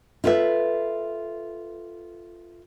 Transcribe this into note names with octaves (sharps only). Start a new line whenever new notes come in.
E4 F4 A4 B4 E5